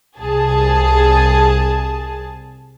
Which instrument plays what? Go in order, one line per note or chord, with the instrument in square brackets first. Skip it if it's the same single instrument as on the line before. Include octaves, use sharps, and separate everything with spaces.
[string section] C2 G#4 A5